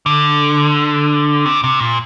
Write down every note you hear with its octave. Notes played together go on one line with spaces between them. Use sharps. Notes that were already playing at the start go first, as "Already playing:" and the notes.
D3
C3
C3
A#2